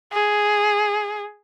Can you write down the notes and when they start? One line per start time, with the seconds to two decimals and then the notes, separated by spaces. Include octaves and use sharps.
0.13 G#4